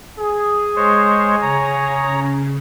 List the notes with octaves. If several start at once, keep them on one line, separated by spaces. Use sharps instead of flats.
G#4
G#3 C5 C#5
C#3 C#5 A#5